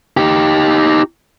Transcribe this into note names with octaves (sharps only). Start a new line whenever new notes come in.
D#4 G4